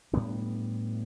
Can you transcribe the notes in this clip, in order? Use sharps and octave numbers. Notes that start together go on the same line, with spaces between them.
A2 G3 B3 D4